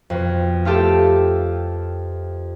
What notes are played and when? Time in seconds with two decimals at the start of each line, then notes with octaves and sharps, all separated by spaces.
0.10 F2 B2
0.65 A3 F4 G4 A4